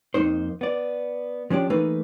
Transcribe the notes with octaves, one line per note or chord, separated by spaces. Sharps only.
F2 A#3 D#4 C5
B3 D5
F3 C#4 D4 G4
E3 A3 A#3 D#4 B4